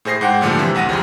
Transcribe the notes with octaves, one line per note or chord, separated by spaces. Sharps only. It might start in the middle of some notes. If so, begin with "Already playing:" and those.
A2 G#4 C5 A#6 C7
G#2 F#5 G5
A#2 D3 F3 G3 A3
C3 E3
A1 D2 F#5 A#6 D#7
F#2 C#3 F3 G3